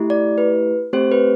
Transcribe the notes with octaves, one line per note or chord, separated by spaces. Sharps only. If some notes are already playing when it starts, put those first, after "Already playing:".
Already playing: A3 E4 G4
D5
B4
A3 C4 G4 C5
B4